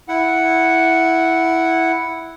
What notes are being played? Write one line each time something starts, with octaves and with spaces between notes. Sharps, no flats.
E4 F#5